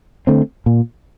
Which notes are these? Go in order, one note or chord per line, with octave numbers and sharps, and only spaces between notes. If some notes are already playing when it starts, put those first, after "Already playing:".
D3 A3 C4
A#2